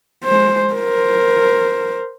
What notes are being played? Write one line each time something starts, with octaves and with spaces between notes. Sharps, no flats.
G#3 C5
A#4 C5